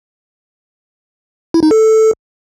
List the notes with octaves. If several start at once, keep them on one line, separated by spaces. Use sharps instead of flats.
E4
D#4
A4